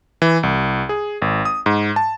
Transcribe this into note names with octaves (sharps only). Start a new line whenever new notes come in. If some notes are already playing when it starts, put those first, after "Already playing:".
E3
C2
G#4
G#1
D#6
G#2
A5